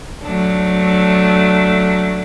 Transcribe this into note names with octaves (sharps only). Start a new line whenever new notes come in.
F#3 A3 D4